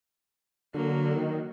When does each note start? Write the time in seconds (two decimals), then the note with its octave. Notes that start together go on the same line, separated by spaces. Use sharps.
0.74 D3 F#3 A#3
1.16 D#3